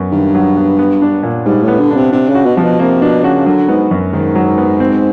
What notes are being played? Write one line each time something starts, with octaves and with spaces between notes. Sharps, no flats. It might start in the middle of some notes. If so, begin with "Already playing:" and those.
Already playing: F#2 B3
G2 D#3
F#3
B3
B3
D4
A#2
G#2 G3
A2
B3
D3
D4
C3
C3 D4
C#3
F#4
B2
C3 F3
B2
C3 A#3
B2 D4
C#3 F#4
D3 F#3
G#2 B3
F#2
G#2 D#3
F#3
B3
C4